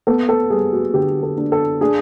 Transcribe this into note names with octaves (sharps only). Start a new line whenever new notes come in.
B3 A4
A4
G3 G#4
F#4
D3 G4
A4
D4
A4
D4 G#4